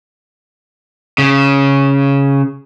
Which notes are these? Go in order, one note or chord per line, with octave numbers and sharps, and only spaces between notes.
C#3